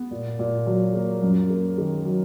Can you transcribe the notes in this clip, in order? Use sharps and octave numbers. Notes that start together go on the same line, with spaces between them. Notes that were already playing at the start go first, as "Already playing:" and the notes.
Already playing: B3
A#2
A#2
F#3
A#3
F#2
A#3
D#3
F#3